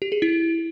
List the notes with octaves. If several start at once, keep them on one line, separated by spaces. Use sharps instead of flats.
G4
G#4
E4